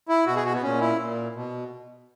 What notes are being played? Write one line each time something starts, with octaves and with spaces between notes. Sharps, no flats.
E4
B2 F#4
G#4
F#4
B3
A#2 C#4
E4
A#2
B2